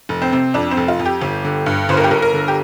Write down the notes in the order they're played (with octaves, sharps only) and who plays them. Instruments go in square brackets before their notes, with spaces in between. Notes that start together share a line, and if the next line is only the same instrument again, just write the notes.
[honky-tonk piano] F1
C4
C3
F2 D4
C4
F1
F4
F2
G4
G1
D3
G2
G1 C5
A#4
G4
G1 A#4
A#4
D3
G4